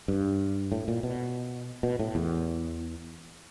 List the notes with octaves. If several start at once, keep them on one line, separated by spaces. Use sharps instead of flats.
G2
A2
A#2
B2
B2
A2
E2